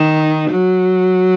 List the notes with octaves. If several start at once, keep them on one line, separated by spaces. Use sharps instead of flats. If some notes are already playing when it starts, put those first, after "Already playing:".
Already playing: D#3
F#3